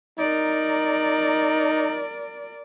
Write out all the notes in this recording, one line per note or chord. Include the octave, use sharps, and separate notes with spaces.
D#4 A#4 D5